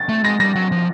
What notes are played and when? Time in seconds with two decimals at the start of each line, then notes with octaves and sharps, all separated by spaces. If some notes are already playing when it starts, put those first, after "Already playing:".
Already playing: A6
0.09 A3
0.24 G#3 A#6
0.40 G3 A#6
0.56 F#3
0.72 F3